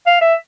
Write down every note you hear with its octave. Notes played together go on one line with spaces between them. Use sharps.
F5
E5